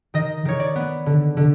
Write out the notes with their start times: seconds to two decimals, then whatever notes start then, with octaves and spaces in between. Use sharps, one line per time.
0.14 D#3 D#5
0.45 D#3 C#5
0.60 D5
0.76 B3
1.06 D3
1.37 D3